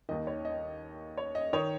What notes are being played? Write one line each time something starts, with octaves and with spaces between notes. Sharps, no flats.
D#2 D#3 D#5
C#5
D#5
C#5
D#5
D#3 C#5